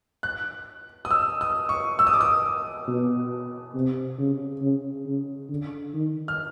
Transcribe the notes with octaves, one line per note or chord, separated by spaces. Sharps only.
F#6
D#6
E6
D#6
C#6
E6
D#6
D6
D#6
B2
C3
C#3
C#3
C#3
D3
D#3
F6